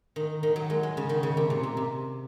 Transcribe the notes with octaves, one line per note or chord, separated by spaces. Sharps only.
D#3
D#3
F#3
G#3
G#3
C#3
D#3
C#3
C3
A#2
C3
C3